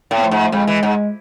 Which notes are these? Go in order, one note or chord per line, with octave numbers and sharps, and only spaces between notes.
A2
B3
F3 A3
G#2
F2 G#3
E3
G#2